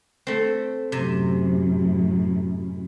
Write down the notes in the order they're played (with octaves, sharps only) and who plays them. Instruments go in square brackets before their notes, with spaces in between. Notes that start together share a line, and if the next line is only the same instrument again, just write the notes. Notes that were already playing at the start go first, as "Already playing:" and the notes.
[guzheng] A3 C4
[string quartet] F#2 A2 [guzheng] C3